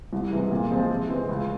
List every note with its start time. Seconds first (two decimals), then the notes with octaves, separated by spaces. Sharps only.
0.13 C2
0.31 C3 E3 G#3
0.51 A#2
0.71 F3 G#3 C4
0.90 C3
1.09 E3 G#3 C4
1.29 C#2